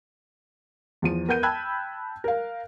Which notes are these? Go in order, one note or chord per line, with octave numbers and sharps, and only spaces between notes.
E2 F3 D#7
B3 A#4 F#5 G6 D#7
G5 A5 B5 E6 F#6 G#6
A#4 F5